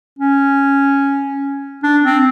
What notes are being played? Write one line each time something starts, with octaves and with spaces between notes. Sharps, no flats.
C#4
D4
C4